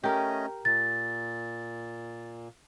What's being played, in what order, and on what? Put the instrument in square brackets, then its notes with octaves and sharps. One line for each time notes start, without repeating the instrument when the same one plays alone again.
[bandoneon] A3 C#4 D#5 [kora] G4 A#4
[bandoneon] A#2 [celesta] A6